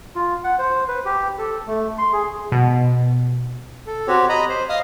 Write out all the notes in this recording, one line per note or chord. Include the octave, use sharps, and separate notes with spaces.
F4
F#5
C5
B4
G4
A4
A3
C6
G#4
B2
A4
C4 F#4 G4 C#5
D#5 A#5 B5
C5
D#5 F5 D#6